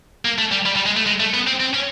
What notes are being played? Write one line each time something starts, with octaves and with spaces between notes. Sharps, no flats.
A#3
A3
G3
G3
G3
G#3
A3
G#3
A3
B3
C4
C4
C#4